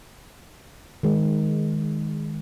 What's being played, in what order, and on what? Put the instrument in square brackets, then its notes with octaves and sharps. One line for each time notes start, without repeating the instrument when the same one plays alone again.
[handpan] D#3 G#3